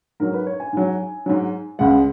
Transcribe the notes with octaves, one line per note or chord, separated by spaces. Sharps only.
G#2 F#3 A#4
B4
C#5
G#5
G#2 F#3
G#2 F#3
C#2 C#3 G#3 F#5